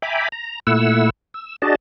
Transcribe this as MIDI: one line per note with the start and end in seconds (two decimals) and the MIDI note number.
0.02 0.29 76
0.02 0.29 79
0.02 0.29 80
0.02 0.29 82
0.02 0.29 83
0.02 0.29 86
0.32 0.60 82
0.67 1.10 46
0.67 1.10 57
0.67 1.10 64
0.67 1.10 78
0.67 1.10 88
1.34 1.56 88
1.62 1.75 62
1.62 1.75 66
1.62 1.75 68
1.62 1.75 74
1.62 1.75 75
1.62 1.75 81